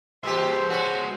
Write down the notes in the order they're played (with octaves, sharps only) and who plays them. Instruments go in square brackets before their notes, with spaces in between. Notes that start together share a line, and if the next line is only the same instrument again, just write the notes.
[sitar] A#2 G4 [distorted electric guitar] G#3 E5 [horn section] C5
[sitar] C#4 B4 [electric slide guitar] F#4